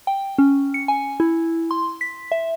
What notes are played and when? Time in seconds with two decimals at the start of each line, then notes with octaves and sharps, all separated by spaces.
0.07 G5
0.38 C#4
0.74 C#7
0.88 G#5
1.20 E4
1.71 C6
2.01 B6
2.32 E5